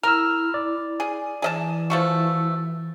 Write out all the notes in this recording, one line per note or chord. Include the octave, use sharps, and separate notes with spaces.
E4 A#4 E6 F6
D5
G#4
E3 G#4 D#5 A5
F3 A3 F#4